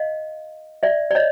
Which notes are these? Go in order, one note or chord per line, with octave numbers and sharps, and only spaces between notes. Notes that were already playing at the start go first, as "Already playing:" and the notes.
Already playing: D#5 F5
D5 E5
D5
C#5 D#5